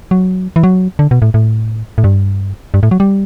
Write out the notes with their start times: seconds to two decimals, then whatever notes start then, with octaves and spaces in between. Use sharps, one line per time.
0.11 F#3
0.56 E3
0.63 F#3
0.99 D3
1.11 B2
1.22 A2
1.34 A2
1.98 A2
2.04 G2
2.74 G2
2.83 A2
2.91 F#3
3.00 G3